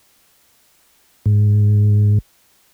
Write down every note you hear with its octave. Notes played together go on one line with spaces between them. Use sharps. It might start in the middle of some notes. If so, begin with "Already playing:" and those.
G#2